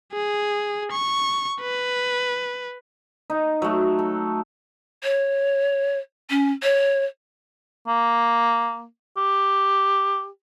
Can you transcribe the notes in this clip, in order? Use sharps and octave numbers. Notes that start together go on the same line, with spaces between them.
G#4
C#6
B4
D#4
F#3 A3
A4
C#5
C#4
C#5
A#3
G4